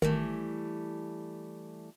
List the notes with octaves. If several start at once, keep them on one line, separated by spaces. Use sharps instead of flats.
G#1 D#3 E3 G3 A3